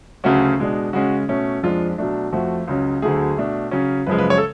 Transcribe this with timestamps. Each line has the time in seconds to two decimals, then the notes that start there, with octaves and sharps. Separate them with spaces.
0.24 D2 C#3 F#3 A3 C#4 F#4
0.59 B2 G#3 D4
0.93 C#3 G#3 C#4 F#4
1.29 B2 A3 C#4
1.63 F2 F3 G#3 D4 F4
1.98 B2 F#3 A3 D4
2.33 F2 F3 A3 F#4
2.68 C#2 C#3 F#3 C#4
3.02 D2 D3 F#3 A3 G#4
3.38 B2 A3 D4
3.71 C#3 F#3 C#4
4.06 F#2 C#3 F3 G#3 B4
4.18 B4
4.30 C#5
4.37 A4